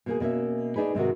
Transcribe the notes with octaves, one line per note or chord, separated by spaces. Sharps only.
B2 A#3 G#4
B2 A#3 C#4 E5
D4 D#4 G#4 B4
G#2 C3 D#3 F#4